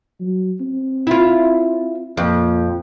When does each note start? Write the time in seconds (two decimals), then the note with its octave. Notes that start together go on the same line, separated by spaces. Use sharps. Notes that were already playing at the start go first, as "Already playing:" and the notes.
0.20 F#3
0.61 C4
1.07 E4 F4
2.17 F2 A#2